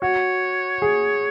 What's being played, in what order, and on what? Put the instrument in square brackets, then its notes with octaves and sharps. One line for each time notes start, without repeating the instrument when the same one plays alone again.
[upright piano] F#4 [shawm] C#5
[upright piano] G#4